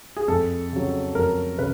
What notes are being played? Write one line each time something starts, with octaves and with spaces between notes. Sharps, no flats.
G#4
F2 A4
C#3 F#3
F2 A#4
C#3 B4